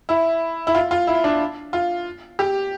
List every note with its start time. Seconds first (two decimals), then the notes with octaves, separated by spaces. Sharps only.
0.09 E4
0.67 E4
0.75 F4
0.91 F4
1.07 E4
1.24 D4
1.73 F4
2.39 G4